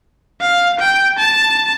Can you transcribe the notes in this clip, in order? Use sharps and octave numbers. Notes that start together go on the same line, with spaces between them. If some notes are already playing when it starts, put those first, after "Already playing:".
F5
G5
A5